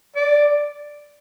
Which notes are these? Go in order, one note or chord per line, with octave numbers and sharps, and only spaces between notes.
D5